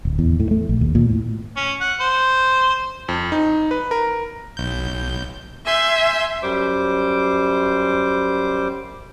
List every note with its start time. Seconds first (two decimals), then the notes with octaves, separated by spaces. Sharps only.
0.05 D1
0.19 E2
0.40 A2
0.51 A3
0.69 A#1
0.81 D#2
0.95 A#2
1.09 A2
1.57 C#4
1.80 F#5
2.00 C5
3.09 F2
3.32 D#4
3.71 B4
3.91 A#4
4.57 B1 G6
5.67 E5 G#5 C6 G6
6.43 F#2 G3 C5 D6